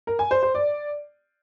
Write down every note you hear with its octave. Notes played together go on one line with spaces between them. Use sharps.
A#4
G#5
C5
C5
D5